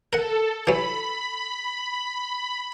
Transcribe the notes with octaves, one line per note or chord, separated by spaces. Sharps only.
A4 A#4 F#5
E3 F#3 B5